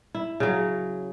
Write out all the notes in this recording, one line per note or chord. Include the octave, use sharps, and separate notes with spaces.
E4
C#3 F#3